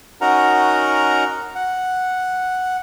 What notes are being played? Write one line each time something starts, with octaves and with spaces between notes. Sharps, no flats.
C#4 D#4 F#4 A#4 F#5 A#5
F#5